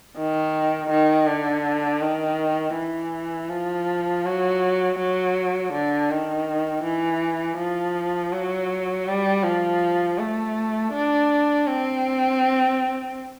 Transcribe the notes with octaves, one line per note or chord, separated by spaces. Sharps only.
D#3
D#3
D3
D#3
E3
F3
F#3
F#3
D3
D#3
E3
F3
F#3
G3
F3
A3
D4
C4